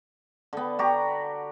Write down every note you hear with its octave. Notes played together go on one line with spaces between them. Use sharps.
D3 B3
F#4 G4 A#5